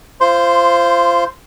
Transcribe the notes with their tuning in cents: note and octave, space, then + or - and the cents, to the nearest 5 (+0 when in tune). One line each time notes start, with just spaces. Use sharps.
F4 -25 C5 +0 C6 -5